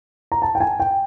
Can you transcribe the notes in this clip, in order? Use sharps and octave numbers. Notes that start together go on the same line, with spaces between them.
A#5
A5
G5
G#5
G5